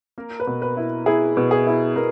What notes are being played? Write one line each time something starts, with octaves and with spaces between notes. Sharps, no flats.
A#3 A#4
B4
B2
B4
E4
E4 G#4
B2
G#4
E4
B2 A#4